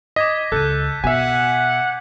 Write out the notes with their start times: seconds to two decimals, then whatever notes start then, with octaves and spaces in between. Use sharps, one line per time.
0.16 D#5 D6 G#6 B6
0.52 C#2 A4 F#6 G6 D#7
1.04 B2 E5 F#5 G#5